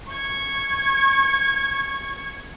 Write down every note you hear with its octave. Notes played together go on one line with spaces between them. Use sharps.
C#6 G#6